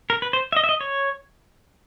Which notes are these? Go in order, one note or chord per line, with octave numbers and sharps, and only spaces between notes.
A#4
B4
C5
E5
D#5
E5
D#5
C#5